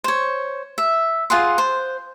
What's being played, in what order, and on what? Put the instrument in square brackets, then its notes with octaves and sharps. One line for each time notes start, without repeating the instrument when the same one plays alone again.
[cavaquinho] C5 C#5
E5
F4 G#4 F#5 C6
C5